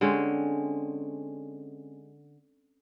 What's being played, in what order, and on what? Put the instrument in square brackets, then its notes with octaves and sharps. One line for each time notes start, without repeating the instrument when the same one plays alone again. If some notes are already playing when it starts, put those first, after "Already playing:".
[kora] D3 G#3 C4 C#4